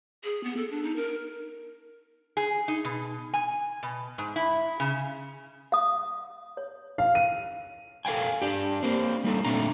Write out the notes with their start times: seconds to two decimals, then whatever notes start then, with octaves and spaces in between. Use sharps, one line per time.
0.24 G#4
0.44 B3
0.57 A4
0.71 D4
0.83 D#4
0.96 A#4
2.37 G#4
2.68 D#4
2.85 B2
3.33 G#5
3.83 B2
4.18 G#2
4.36 E4
4.80 C#3
5.72 F5 D#6
6.57 C#5
6.98 F5
7.15 D#7
8.05 A4 A#4 F5 G5 G#5
8.42 D4 G4
8.83 A#3 C4
9.24 G3 A#3 D#4 A4
9.45 A#2 A3 A#3 C4 D4 A#5